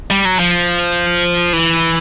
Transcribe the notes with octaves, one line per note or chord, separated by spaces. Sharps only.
G3
F#3
F3
E3